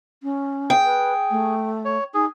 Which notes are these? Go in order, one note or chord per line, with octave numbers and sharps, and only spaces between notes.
C#4
G#4 G5
B4
A3
C#5
D#4 G#4